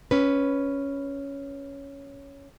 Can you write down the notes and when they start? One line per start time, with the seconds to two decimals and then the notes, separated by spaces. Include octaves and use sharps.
0.11 C#4 B4